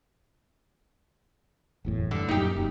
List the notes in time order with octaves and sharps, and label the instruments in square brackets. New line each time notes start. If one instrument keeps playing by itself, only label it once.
[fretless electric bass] F#1 E2 A2
[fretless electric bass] G2 [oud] D3
[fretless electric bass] F#2 A#2 [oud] D#4 G4
[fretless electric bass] F1 F#2